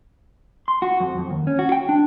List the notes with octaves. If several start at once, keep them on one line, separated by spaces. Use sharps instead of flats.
C6
F#4
F2
F2
D#2
C#4
F#4
G5
D4